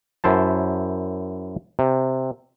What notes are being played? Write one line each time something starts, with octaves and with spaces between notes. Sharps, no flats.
F#2 E4 C5 A5
C3